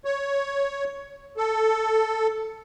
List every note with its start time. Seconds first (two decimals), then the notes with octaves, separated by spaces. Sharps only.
0.05 C#5
1.37 A4